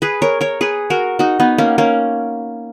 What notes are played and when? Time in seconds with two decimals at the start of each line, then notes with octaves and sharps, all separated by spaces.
0.02 G#4 B4
0.22 A#4 C#5
0.41 A#4 C#5
0.61 G#4 B4
0.90 F#4 A#4
1.19 D#4 F#4
1.40 B3 D#4
1.58 A#3 C#4
1.78 A#3 C#4